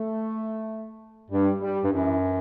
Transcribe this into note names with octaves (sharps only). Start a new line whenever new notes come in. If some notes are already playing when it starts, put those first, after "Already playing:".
Already playing: A3
G2 G3
G3
G2
F#2 E3